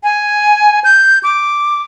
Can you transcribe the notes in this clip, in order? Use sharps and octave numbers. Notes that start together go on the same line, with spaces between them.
G#5
G6
D6